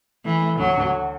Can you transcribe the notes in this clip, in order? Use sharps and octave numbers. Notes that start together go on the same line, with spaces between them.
E3 A3
A3
D2 F#3
D2